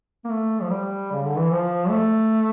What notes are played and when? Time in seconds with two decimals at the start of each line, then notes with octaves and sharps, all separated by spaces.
0.24 A#3
0.30 A3
0.62 F3
0.70 G3
1.12 C#3
1.24 D3
1.37 E3
1.51 F3
1.90 A3